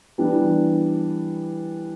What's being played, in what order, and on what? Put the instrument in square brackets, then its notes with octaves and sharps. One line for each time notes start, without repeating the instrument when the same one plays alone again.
[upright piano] E3 G3 B3 D4